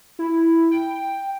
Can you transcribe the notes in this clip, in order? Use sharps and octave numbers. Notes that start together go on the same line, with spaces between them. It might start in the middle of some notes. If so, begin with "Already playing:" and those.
E4
G5